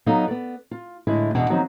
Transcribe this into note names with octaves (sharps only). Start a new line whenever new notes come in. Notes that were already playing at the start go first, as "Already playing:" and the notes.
F#3 B3 D#4 A4 D#5 F5
B3 D5
F4
A2 D3 G#3 E4
E2 B2 G#3 D4 F#5 A5
D#3 F3 F#3 B3 C4 D#4